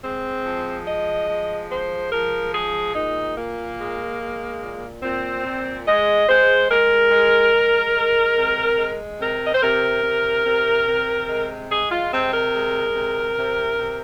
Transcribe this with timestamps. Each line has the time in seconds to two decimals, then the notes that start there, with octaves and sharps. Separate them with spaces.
0.03 G#3 C4
0.45 F3
0.86 G#3 D#5
1.28 F3
1.69 G#3 C5
2.11 F3 A#4
2.53 G#3 G#4
2.94 A#2 D#4
3.36 A#2 A#3
3.79 G#3
4.20 G#3
4.62 A#2
5.02 A#2 C4
5.44 A#2
5.87 G#3 D#5
6.28 G#3 C5
6.70 G#3 A#4
7.11 G#3
7.53 G#3
7.95 G#3
8.36 C3
8.78 G#3
9.19 C3 A#4
9.46 D#5
9.53 C5
9.62 C3 A#4
10.03 C3
10.45 C3
10.87 C3
11.28 G#3
11.69 G#3 G#4
11.91 F4
12.12 C3 C4
12.33 A#4
12.53 G#3
12.95 C3
13.37 C3
13.78 C3